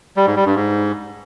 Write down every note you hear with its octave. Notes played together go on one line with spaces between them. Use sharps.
G3
G#2
G3
G2
G#2